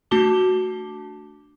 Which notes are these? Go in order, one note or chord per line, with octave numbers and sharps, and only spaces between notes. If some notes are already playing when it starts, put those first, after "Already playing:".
A3 D4 F#4 A5 D6 G7